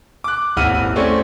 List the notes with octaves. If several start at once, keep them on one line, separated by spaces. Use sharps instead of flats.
D6 F#6
D#1 G#1 E4 F#5 F6 D#7
A3 C4 C#4 D5